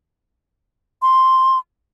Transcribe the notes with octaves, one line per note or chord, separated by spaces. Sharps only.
C6